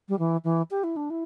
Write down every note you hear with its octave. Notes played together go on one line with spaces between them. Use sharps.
G3
E3
E3
G4
E4
D4
E4